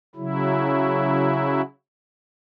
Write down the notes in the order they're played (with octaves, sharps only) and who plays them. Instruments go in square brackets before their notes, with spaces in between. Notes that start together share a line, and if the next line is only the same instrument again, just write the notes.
[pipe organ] C#3 F#3 E4